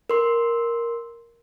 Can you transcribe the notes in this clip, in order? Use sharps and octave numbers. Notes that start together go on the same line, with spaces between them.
A#4 C6